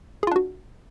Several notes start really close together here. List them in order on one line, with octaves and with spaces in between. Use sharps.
G#4 F4 D4 F#4